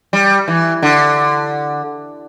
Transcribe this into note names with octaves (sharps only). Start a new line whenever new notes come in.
G3
E3
D3